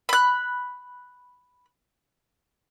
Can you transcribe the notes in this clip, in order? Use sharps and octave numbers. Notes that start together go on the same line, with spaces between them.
B5 F#6